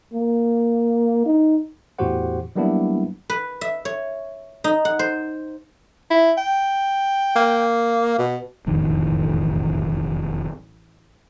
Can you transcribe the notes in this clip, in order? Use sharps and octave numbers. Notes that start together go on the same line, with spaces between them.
A#3
D#4
E2 A2 F#4 G4 C5 F#5
F#3 G3 A#3 B3 D4 E4
B4
E5
C#5
D#4
F#5
C5
E4
G5
A#3
B2
E1 A1 F2 D#3